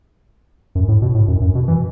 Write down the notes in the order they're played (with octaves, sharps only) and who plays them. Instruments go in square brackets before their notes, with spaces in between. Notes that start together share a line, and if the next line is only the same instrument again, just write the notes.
[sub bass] F#2
A2
B2
A2
F#2
F#2
B2
E3